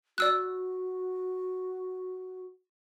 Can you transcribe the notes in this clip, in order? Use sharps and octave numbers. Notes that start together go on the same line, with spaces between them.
F#4 D5 E6 F#6